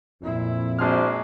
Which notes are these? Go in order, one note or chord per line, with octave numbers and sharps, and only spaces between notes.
F2 A#2 E4
A#1 G#3 D4 F#4 C5 F6